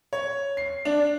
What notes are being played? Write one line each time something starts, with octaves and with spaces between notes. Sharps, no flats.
C#5
C7
D4